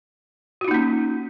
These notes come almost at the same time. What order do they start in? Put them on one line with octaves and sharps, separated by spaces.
F#4 F4 D#4 A#3 C#4